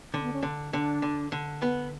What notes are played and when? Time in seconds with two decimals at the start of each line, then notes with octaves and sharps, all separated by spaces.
0.14 D3 C#4
0.23 B3
0.33 C#4
0.43 D3
0.73 D3 D4
1.02 D3
1.32 D3
1.62 B3